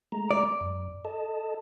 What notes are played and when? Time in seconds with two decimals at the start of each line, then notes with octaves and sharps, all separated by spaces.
0.12 G#3 A3 A#5
0.31 D5
0.61 F#2
1.05 A4 D#5 A5